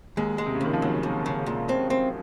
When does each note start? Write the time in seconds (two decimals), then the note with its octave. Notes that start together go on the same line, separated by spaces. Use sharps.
0.17 D#2 G#3
0.38 G#3
0.46 C3
0.55 C#3
0.61 D#2 D#3
0.73 F3
0.82 D#2 F#3
1.03 D#2
1.26 C#3
1.46 A#2
1.69 C4
1.90 C4